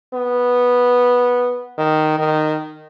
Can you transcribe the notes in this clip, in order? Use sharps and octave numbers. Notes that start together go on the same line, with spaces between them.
B3
D#3
D#3